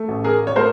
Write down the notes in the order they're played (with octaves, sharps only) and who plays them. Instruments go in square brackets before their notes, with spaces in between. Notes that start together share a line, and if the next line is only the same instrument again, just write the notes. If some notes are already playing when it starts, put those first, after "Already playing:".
Already playing: [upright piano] A3
A1
G#4 A#4
C#5
A3 A#4 C5